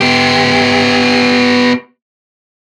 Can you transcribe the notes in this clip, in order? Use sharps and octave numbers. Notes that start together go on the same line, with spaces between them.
B3 G4